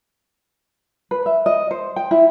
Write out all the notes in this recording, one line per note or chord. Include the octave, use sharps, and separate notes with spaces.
B4
E5
D#5
C5
G5
E4